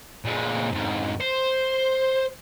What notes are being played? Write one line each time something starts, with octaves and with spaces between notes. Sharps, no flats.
A#2 G#3
F2 G#2
C5